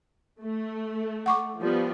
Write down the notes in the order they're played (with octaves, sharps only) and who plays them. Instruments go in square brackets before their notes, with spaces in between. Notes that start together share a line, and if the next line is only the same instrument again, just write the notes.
[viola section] A3
[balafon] F#5 C#6 D6
[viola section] F3 G3 B3